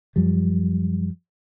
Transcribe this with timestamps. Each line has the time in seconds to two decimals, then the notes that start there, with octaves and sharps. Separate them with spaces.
0.16 F#2 F3 G3